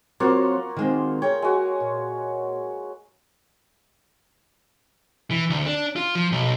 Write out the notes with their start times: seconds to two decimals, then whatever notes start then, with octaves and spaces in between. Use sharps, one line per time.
0.20 F#3 A#3 C4 F4 F#4 C#5
0.77 D#3 G#3 C4
1.22 G#4 A#4 C#5 G5
1.42 G#3 F#4
1.80 A#2
5.31 E3
5.50 D2
5.66 D4
5.96 F4
6.15 F3
6.32 B1